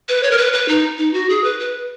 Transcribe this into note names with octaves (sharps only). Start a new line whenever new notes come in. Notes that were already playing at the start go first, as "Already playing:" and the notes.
B4
C#5
A#4
B4
B4
D#4
D#4
F#4
G#4
B4
B4